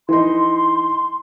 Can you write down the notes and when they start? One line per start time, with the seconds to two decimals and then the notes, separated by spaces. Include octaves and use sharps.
0.09 E3 D#4 C6